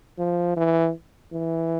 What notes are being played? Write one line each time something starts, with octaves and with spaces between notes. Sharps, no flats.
F3
E3
E3